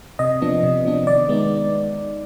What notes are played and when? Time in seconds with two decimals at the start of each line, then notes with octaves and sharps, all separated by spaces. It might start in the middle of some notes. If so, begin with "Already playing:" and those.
0.19 C3 D#5
0.42 F3 B3 D4
0.63 C3
0.85 F3 B3 D4
1.07 D#3 D5
1.29 G#3 B3 D#4